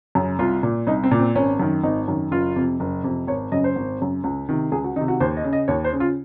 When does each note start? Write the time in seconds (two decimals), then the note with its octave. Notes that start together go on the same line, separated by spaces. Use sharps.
0.15 F#2 C#3
0.39 C2 F4
0.63 A#2
0.87 C2 D#4
1.04 C4
1.11 A#2
1.19 C4
1.35 G#1 C#4
1.60 F#2 D#3
1.83 G#1 D#4
2.08 F#2 D#3
2.31 F#1 F4
2.56 F2 C3
2.80 F#1
3.03 F2 C3
3.27 G#1 C#5
3.52 F#2 C#3 D#5
3.64 C5
3.76 G#1
4.00 F#2 C#3
4.24 C#2
4.49 C3 D#3
4.72 C#2 G#4
4.84 F#4
4.96 D#3 D#4
5.01 C3
5.08 F#4
5.20 D#2 C5
5.37 D#5
5.44 C#3
5.53 D#5
5.68 D#2 C#5
5.84 C5
5.93 C#3
6.00 F4